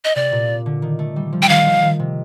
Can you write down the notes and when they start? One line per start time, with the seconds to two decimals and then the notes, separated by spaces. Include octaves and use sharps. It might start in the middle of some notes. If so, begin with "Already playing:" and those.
0.05 D#5
0.16 C3 D5
0.32 A#2
0.66 D3
0.82 D#3
0.99 A3
1.16 G3
1.33 F3
1.42 G5
1.49 D#3 F5
1.66 F3
1.82 D#3
1.99 C3